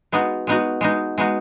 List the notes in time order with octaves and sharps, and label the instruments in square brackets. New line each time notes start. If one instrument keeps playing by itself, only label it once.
[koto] G#3 B3 D#4 F#4
G#3 B3 D#4 F#4
G#3 B3 D#4 F#4
G#3 B3 D#4 F#4